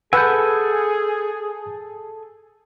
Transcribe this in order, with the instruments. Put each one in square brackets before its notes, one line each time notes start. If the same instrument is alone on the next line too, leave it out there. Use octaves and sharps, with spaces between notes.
[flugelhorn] G#4 [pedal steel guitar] A4 G#5 [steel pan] B4 F#5 [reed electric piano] E6 G6